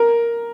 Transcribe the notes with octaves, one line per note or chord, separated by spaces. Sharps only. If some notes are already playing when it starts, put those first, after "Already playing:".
Already playing: A#4